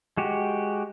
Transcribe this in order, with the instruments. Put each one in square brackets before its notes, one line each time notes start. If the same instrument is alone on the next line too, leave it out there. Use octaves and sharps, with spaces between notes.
[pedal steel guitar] G#3 F#4 G4